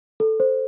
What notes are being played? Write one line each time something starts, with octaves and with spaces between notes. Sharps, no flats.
A4
C5